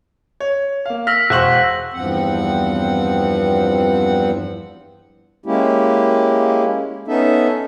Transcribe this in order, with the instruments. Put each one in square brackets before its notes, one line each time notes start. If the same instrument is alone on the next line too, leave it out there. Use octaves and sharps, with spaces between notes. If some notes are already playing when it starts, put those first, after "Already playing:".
[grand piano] C#5
A#3 F5
[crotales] E6 A#6 B6 [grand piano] F6
[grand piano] E1 C5 C#6 [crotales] F#6 F#7
[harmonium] E2 G2 F3 C4 F#5
G#3 A#3 C#4 E4 G4
B3 C#4 D#4 A4 E5